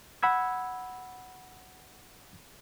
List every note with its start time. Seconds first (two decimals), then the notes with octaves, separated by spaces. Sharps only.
0.23 F#5 B5 E6 G#6